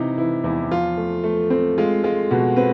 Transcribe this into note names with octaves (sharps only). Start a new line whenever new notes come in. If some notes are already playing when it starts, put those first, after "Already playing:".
Already playing: C3 E3 D#4 E4
E3 E4
E2 E4
F3 F4
A3
A3
C4
G#3 F4
G#3 F4
B2 F#4
C4 B4